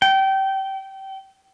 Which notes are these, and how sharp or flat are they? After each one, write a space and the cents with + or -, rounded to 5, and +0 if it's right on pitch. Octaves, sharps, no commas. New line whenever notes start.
G5 -25